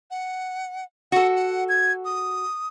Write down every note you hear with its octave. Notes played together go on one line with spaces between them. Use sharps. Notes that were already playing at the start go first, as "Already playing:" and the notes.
F#5
F#4 A4 F#5
F#5
G#6
D#6